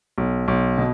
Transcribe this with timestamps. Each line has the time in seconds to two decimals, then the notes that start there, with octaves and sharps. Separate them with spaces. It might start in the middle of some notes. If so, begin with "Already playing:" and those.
0.18 B1
0.48 B1
0.78 B2